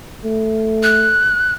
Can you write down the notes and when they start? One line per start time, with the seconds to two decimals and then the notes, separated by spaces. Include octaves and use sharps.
0.24 A3
0.83 F#6